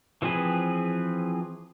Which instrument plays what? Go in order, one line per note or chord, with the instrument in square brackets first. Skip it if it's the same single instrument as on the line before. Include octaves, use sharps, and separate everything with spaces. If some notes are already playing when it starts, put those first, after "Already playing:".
[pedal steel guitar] E3 F3 C4 G#4 B4